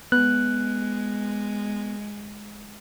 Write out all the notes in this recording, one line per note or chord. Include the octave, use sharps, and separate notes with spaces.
G#3 B3 F#6